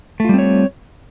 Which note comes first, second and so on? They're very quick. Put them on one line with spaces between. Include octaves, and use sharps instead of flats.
A3 F4 G3 C4 C#5